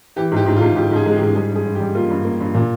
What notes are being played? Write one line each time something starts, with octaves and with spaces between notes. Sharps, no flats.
E3 G4
G#2 G4
G#2
F4
G#2
G#2 G4
G#2 G#4
G#3
G4
G#2
G3 G#4
G2
G#4
G2
G4
G3
A#3 F4
G2
A#3
G2
A#2